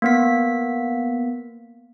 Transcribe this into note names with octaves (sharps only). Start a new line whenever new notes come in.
A#3 B3 B6